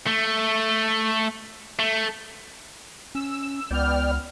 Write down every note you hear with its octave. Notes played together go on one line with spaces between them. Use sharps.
A3
A3
C#4 E6
C#2 B3 D5 G5 F6